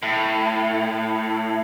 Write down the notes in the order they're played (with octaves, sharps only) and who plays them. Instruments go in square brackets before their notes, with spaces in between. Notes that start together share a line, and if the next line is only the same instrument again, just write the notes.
[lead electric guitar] A2